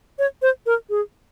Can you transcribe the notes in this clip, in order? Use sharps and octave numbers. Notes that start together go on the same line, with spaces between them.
C#5
C5
A#4
G#4